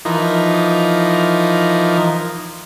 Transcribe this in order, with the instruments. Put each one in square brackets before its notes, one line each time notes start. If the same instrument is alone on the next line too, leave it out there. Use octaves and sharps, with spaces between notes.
[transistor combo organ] E3 F3 D#4 A#4